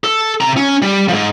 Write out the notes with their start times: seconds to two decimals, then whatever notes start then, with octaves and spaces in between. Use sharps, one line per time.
0.04 A4
0.41 C3 A#5
0.57 C#4
0.82 G3
1.09 G#2 F3